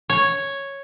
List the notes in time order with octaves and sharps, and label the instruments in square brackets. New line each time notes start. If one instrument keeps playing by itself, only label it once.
[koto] C#5